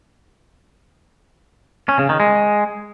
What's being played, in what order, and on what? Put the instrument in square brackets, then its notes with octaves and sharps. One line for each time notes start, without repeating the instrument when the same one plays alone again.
[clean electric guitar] C#4
C#3
D#3
G#3